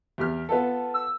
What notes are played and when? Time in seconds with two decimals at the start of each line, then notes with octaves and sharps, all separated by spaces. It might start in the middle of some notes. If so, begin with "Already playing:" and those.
0.18 E2 G4 F6
0.49 B3 F4 A4
0.94 E6